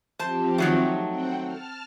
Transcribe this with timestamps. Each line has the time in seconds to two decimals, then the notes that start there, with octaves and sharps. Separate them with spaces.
0.19 F3 C4 G4 C5 A5
0.58 D#3 F#3 A3
1.07 C4 F#5 G5
1.43 A5 F6